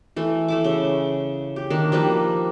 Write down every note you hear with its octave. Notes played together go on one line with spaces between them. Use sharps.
E3 A3
A3 E4 D6
C#3
G4
D#3 A#3 D4
F3 G3 A#3 B4